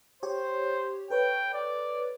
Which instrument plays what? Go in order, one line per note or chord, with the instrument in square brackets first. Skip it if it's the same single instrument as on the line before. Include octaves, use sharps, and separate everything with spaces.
[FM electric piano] G4 C#5 [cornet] C5
[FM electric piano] A4 B4 C#5 [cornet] G5
[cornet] D5